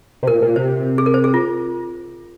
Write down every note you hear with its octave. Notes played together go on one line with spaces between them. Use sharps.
C3
A#2 A#4
A#2
C3 C5
G#4
A#4
C5
G#4
F4